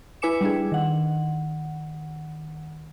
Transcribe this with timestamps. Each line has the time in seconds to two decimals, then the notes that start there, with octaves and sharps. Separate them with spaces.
0.22 E4 B4 G#5 D6 C#7 E7
0.41 G3 D4 G#4
0.72 D#3 F#5